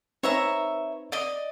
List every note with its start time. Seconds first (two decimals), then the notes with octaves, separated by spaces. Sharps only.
0.23 C4 D#4 B4 C#5 E5 A#5
1.12 D5 D#5 D#6